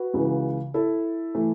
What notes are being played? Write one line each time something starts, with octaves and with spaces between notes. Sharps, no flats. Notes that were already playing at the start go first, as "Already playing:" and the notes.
Already playing: F#4 B4
C#2 C#3 E3
E4 A4
E3 A3